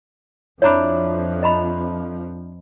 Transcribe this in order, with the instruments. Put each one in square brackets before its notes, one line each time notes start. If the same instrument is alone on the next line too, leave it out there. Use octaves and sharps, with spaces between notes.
[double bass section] F2 F3 [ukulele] D4 E4 [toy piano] C#5 A#5 B5
[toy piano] D#5 A#5 B5